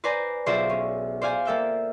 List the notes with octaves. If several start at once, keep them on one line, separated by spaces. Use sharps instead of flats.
B4 C5 D5 G#5 A#5
B1 F4 G#4 C5 D5 E5
C#4
C5 D5 F5 G#5
A#3 A4 E5 G5